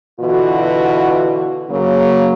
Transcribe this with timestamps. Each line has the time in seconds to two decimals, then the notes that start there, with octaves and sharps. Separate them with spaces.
0.20 B2 D3 E3 F4 F#4
1.69 C#3 F#3 A#3